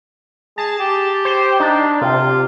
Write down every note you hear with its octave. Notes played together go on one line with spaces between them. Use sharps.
G#4 A5
G4
C5
D4 D#4
C3 F4